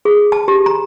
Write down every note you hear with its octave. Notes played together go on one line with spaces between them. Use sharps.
G#4
A5
G4
A#5